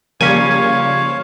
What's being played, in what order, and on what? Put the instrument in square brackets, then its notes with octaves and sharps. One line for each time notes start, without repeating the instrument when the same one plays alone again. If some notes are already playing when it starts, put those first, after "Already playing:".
[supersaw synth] C#3 G3 A#3 [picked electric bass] F3 [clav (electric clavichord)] C#4 G#5 [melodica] C#5 F5